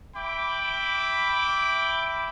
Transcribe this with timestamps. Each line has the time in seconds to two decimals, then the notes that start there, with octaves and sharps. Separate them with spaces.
0.16 E5 G5 B5 D6